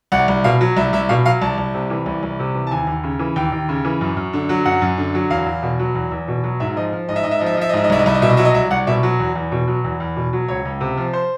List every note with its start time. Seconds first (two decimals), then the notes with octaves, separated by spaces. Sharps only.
0.12 C2 F#5
0.28 C2
0.44 B2 F5
0.61 F#3
0.77 C2 E5
0.93 C2 E5
1.09 B2 F5
1.26 F#3 F5
1.42 C2 A5
1.58 C2
1.74 C3
1.90 E3
2.06 C2
2.23 C2
2.39 C3
2.54 E3
2.67 A5
2.71 D#2 G#5
2.87 D#2
3.04 C#3
3.19 E3
3.36 D#2 G5
3.52 D#2
3.69 C#3
3.85 E3
4.01 F#2
4.17 F#2
4.33 D3
4.49 F#3
4.65 F#2 F#5
4.82 F#2
4.97 D3
5.15 F#3
5.30 E2 F5
5.46 E2
5.63 B2
5.79 F#3
5.95 E2
6.11 E2
6.28 B2
6.44 F#3
6.60 G#2 E5
6.76 F3 D#5
6.92 F3
7.09 G#2 D#5
7.16 E5
7.23 G#2 D#5
7.31 E5
7.39 F3 D#5
7.46 E5
7.54 D#5
7.57 F3 E5
7.69 D#5
7.73 G#2 E5
7.84 D#5
7.90 C2 E5
7.99 D#5
8.06 C2 E5
8.14 D#5
8.22 B2 E5
8.30 D#5
8.37 F#3 E5
8.45 D#5
8.54 C2 E5
8.71 C2 F#5
8.87 B2 E5
9.03 F#3
9.19 E2
9.35 E2
9.52 B2
9.68 F#3
9.84 E2
10.00 E2
10.16 B2
10.33 F#3
10.48 C#2 C#5
10.65 C#2
10.81 C3
10.97 F3
11.13 C5